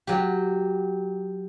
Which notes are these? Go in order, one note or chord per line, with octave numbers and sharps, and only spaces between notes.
F#3 G4